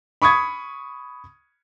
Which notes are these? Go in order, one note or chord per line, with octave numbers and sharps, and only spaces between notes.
B5 C#6 D#6 G#6